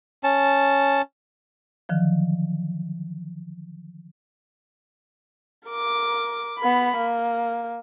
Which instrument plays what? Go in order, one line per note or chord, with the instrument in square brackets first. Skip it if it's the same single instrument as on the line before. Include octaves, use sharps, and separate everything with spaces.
[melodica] C#4 A5
[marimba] D3 D#3 F3 F#3
[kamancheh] A#4 D6
B3 B5
A#3